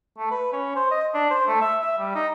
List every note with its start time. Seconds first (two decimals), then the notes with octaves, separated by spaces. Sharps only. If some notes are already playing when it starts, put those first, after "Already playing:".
0.18 A3
0.31 B4
0.53 C#4
0.76 C5
0.91 D#5
1.14 D4
1.30 C5
1.47 A3
1.61 E5
1.82 E5
1.98 G3
2.15 D#4